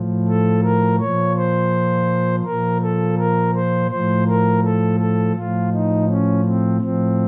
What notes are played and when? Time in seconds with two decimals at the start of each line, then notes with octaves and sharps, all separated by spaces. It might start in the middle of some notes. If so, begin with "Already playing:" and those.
Already playing: A2 F3
0.28 A4
0.63 A#4
1.00 A#2 F3 C#5
1.37 C5
2.45 A#2 F3 A#4
2.82 A4
3.18 A#4
3.55 C5
3.91 A2 F3 C5
4.28 A#4
4.64 A4
5.00 A4
5.36 A2 F3 F4
5.72 D#4
6.09 C#4
6.45 C4
6.81 A2 F3 C4